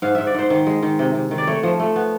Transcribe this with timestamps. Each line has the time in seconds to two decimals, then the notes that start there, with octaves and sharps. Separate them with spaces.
0.02 G#2 F5
0.15 G#2 E5
0.27 D5
0.34 G#2 C5
0.50 D#3 C5
0.67 G#3
0.82 D#3
0.99 C3
1.15 C3
1.31 D#3
1.38 D5
1.47 A3 C#5
1.63 F3
1.80 A3
1.96 B3